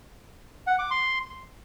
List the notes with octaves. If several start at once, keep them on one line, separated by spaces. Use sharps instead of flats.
F#5
D6
C6